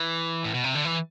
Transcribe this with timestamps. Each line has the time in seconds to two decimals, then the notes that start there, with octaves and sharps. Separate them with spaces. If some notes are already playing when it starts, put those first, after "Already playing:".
Already playing: E3
0.44 A2
0.54 B2
0.64 C3
0.75 D3
0.85 E3